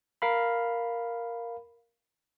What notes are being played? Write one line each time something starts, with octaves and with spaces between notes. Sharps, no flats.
A#4 F5 B5